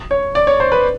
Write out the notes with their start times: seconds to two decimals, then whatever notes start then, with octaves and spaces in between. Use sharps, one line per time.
0.11 C#5
0.35 D5
0.47 C#5
0.60 C5
0.72 B4